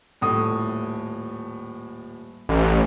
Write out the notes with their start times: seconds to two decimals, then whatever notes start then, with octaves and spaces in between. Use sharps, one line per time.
0.21 D#1 A2 D#6
2.49 A1